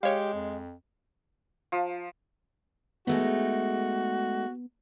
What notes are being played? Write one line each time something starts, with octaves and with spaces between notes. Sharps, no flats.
G#3 G4 C#5 F5
F2
F3
G#3 A3 B3 D#4 F#4